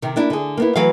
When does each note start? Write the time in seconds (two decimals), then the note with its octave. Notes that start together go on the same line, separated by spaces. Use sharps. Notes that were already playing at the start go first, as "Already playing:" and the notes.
0.02 C3 D#3
0.16 A#3 D4 E4
0.30 D3 G#4
0.57 A#3 B3 E4
0.76 E3 F#3 A3 F5